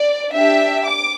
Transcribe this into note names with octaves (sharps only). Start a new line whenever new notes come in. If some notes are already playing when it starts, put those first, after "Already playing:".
Already playing: D5
D4 G4 E5
D6